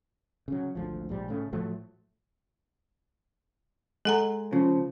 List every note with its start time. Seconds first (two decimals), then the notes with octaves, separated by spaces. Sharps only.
0.48 C#3 F#3
0.75 G#1 D2 F3
1.09 A#1 G#2 G3
1.28 A2 C#3 A3
1.53 A2 F3 F#3 A3
4.05 G#3 A4 F#5 A#5
4.53 C#3 F3